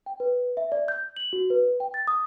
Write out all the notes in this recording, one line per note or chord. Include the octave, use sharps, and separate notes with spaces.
G5
B4
E5
D5
G6
F#7
F#4
B4
G5
A6
D#6